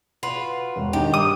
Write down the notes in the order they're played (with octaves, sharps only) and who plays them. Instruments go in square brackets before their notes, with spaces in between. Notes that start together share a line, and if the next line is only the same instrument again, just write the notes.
[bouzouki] F4 F#4 B4
[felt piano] E1
[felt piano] D#3 D4 D#4 [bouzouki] G4
[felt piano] G2 [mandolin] D#6